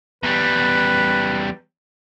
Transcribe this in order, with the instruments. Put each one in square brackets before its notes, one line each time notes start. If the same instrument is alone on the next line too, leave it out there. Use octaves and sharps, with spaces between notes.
[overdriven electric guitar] E2 G3 [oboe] B4